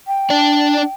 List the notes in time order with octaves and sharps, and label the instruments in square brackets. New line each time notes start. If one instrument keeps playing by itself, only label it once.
[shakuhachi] G5
[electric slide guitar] D4 D5